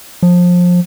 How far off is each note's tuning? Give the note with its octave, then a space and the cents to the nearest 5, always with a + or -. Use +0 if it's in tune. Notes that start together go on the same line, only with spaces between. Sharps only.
F3 +25